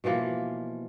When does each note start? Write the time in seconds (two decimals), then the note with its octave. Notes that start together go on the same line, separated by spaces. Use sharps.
0.04 B2 E3 F3 A#3